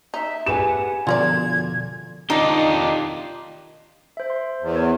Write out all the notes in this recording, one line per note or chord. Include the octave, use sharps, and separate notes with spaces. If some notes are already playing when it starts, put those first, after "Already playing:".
D#4 E5
G4 G#4 B4 F#5 G#5 E7
B2 D3 F3 F4 A#4 D5 G#6
D#3 D4 D#4 F4 G4
C5 E5
C6
E2
A#4 C#5